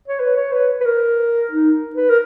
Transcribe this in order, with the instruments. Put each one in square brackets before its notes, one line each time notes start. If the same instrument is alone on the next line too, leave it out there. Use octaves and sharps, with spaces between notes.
[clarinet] C#5
B4
C#5
B4
B4
A#4
D#4
B4
A#4